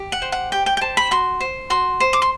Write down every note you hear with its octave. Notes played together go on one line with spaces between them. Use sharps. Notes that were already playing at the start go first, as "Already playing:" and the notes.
Already playing: G4
F#5
C5
F#5
G4 G5
G5
G5
C5 A5
B5
F#4 C6
C5
F#4 C6
C5
D6
C6